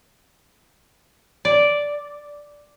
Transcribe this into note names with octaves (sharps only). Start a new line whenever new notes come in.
D5